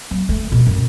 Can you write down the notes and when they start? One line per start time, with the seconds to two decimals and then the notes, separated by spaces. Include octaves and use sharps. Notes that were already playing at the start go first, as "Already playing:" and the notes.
0.11 F#3
0.29 A3
0.52 B2
0.66 F#2